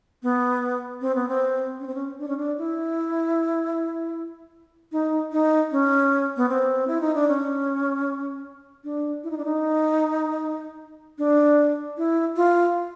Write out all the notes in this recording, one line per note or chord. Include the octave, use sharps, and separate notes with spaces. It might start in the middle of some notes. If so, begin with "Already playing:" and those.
B3
C4
B3
C4
C#4
C4
C#4
D4
C#4
D4
E4
D#4
D#4
C#4
B3
C4
E4
D#4
D4
C#4
D4
E4
D#4
D4
D#4
D4
E4
F4